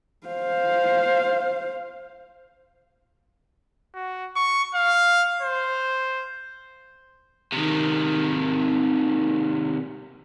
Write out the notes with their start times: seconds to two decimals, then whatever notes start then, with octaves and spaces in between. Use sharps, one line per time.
0.27 C5 F5
3.95 F#4
4.36 C#6
4.75 F5
5.42 C5
7.53 C3 D#3